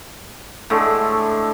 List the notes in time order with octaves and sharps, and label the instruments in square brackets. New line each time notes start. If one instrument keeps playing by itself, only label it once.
[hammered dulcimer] A2 D3 G#3 A3